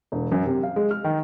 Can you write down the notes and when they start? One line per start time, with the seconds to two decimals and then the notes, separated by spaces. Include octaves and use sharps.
0.12 E1
0.32 F#2
0.46 C3
0.63 F5
0.76 G#3
0.91 F6
1.04 D#3